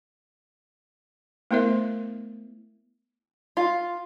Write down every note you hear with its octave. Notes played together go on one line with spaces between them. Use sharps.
A3 B3 E4 A#4 C5 E5
F4